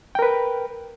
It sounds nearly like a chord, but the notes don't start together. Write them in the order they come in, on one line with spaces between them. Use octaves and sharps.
G5 A#4 B4